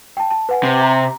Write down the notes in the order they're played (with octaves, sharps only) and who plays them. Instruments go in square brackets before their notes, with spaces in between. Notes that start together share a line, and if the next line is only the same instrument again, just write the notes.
[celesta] G5 A5
A5
B4 F#5 G#5
[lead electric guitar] C3
[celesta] A#5